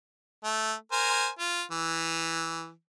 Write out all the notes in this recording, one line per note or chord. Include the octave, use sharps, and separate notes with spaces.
A3
A#4 C5 G#5
F4
E3